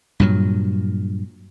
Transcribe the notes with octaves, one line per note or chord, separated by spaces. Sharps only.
G2 A#2 F#3